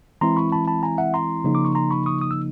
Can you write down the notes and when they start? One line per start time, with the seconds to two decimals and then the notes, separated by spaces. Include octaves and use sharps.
0.21 E3 G#3 C4 E4 A#5 C6
0.37 B5 C#6
0.52 A5 B5
0.67 A5 B5
0.83 G#5 A#5
0.98 E5 F#5
1.14 A#5 C6
1.44 C#3 F3 A#3 D#4
1.55 D6
1.65 C#6
1.75 A#5 C6
1.91 B5 C#6
2.06 C#6 D#6
2.21 D#6
2.31 E6